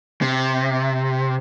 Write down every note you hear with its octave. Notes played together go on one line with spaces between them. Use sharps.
C3